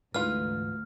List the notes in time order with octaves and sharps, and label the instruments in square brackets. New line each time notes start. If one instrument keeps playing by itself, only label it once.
[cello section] D2 [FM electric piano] G#2 E3 [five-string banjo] F4 B4 [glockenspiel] F6